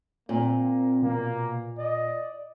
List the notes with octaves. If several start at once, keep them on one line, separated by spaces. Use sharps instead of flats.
A#2 A#3 C4
B2 A#3
D5 D#5